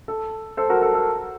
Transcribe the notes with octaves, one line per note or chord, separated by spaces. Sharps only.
A4
A4 C5
F#4 A#4
A4
A4